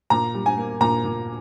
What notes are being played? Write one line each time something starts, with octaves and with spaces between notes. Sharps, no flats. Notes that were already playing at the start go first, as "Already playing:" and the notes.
A#2 A#5
G3
G#5
A#3
A#2 A#5
A#2